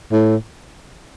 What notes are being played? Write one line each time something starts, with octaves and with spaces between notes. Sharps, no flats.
A2